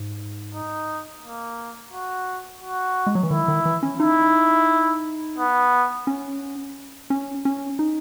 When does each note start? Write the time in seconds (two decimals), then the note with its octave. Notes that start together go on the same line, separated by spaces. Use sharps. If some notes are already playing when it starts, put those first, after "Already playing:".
Already playing: G#2
0.54 D#4
1.23 A#3
1.92 F#4
2.62 F#4
3.07 G#3
3.15 F#3
3.23 E3
3.30 D#3 E4
3.48 D#3
3.65 E3
3.83 C#4
3.99 D#4 E4
5.38 B3
6.07 C#4
7.10 C#4
7.45 C#4
7.79 D#4